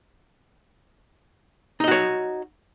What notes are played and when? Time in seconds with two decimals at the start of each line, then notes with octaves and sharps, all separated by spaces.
1.80 D#4
1.84 D#5
1.88 F#4
1.91 C#5